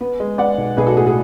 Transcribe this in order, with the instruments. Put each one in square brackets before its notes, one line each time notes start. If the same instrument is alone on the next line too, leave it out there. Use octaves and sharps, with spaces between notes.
[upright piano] B3
G#3
B3 D5 F#5
B1
B1 G#4 B4
F#4 A4
A2 G#4
G#4